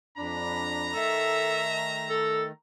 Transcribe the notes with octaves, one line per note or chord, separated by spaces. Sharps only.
F2 D4 A#5 B5
D#3 A3 A4 E5
A4